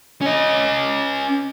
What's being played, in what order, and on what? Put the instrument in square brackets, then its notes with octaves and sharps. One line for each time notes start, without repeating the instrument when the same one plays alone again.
[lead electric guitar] C#4 D#5